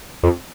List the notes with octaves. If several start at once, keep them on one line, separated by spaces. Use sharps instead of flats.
F2